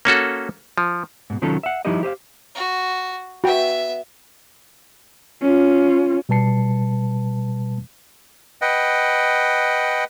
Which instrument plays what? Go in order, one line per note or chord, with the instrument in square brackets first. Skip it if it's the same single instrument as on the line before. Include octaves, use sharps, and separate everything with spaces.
[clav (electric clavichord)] A#3 C#4 F#4 A4
F3
[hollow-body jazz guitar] G#2 B2
C3 D#3 F#3 C#4 F4 A4
E5 F#5
F3 G3 D#4 E4 G4 D#5
G4 C5 D#5 F5
[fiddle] F#4
[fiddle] B3 E5 [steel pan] F#4 G5
[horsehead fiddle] C#4 F4
[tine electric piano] B2 G3 B4 A5 C7 C#7
[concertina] B4 D#5 F#5 G5